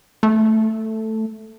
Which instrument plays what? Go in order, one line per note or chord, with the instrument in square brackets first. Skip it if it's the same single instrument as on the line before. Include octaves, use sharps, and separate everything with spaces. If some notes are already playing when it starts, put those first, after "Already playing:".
[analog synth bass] A3